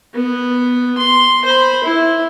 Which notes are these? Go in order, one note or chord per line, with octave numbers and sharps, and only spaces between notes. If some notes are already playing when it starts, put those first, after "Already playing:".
B3
C6
C5 B5
E4